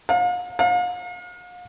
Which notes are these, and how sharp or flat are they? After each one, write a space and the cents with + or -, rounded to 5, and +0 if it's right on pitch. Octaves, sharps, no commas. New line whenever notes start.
F5 +40
F5 +40